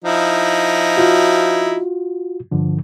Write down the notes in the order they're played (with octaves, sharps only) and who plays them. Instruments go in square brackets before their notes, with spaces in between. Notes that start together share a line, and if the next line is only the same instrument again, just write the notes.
[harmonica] F3 D#4 E4
[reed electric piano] F4 F#4
G2 D3 F3